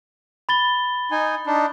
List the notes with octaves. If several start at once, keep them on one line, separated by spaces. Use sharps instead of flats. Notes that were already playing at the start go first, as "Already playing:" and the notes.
B5 A6 G7
D#4 G#5
D4 D#4